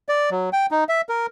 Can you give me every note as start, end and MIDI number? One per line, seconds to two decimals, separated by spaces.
0.09 0.30 74
0.31 0.50 54
0.53 0.66 79
0.71 0.84 63
0.89 1.01 76
1.09 1.26 70